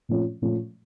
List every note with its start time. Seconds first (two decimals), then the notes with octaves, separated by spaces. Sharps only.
0.09 A#2 F3 A3 C#4 F4
0.42 A#2 F3 A3 C#4 F4